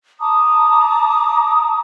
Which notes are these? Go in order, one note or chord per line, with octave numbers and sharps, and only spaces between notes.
A5 A#5 D6 D#6